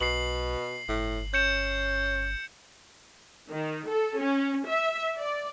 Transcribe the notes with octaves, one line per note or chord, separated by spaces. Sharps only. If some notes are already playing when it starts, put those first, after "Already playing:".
B1 B2 C7 F#7
G1 A2
C#4 G6 C#7 E7
D#3
A4
C#4
E5
D5